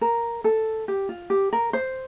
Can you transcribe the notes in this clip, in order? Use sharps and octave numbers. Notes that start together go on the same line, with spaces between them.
A#4
A4
G4
F4
G4
A#4
C5